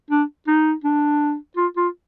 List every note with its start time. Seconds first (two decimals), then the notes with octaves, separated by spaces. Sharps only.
0.10 D4
0.47 D#4
0.84 D4
1.57 F4
1.77 F4